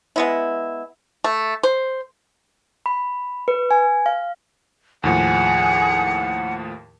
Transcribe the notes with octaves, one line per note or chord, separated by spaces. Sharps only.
G#3 B3 E4
A3
C5
B5
B4
G#5
F5
D#2 A2 F3 G#4 F#5